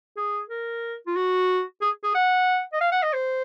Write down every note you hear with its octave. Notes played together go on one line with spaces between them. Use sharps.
G#4
A#4
F4
F#4
G#4
G#4
F#5
D#5
F5
F#5
D#5
C5